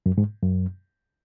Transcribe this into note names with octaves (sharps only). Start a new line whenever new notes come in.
F#2
G#2
F#2